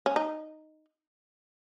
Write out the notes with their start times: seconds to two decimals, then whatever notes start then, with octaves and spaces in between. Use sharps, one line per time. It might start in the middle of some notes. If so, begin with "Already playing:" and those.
0.06 C#4
0.16 D#4